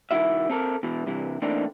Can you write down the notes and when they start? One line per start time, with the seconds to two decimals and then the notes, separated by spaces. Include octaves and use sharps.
0.11 C2 D#3 F3 E4 F#4 E5
0.49 C4 A4 A#4
0.83 B2 E3
1.06 C2 C3 E3
1.42 E3 A3 A#3 C4 D4 D#4